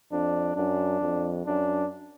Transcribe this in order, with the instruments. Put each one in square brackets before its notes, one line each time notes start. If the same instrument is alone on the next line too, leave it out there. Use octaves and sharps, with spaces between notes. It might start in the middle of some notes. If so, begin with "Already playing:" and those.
[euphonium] F2 [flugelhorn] D4
[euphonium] F#2 [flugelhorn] D4
[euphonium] F2
[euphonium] F#2 [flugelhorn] D4